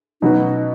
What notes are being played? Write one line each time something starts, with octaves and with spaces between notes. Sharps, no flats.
B2 F#3 C#4 D#4 F#4 B4